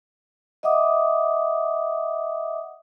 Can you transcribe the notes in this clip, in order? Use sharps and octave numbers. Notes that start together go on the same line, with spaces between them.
D#5 E5 F#5 D6 D#6